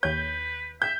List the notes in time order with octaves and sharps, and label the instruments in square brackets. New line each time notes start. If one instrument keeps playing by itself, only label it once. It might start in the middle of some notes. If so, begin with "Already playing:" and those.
[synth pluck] D#2 C#5 [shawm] B4 [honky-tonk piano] G6
[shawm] E5 [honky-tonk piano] G6